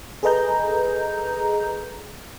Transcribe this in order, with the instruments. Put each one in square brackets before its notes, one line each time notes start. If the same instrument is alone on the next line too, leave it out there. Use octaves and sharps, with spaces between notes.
[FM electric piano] G#4 A4 B4 D#5 A#5 G6